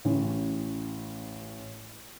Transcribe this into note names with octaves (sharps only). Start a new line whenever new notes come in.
A1 C#4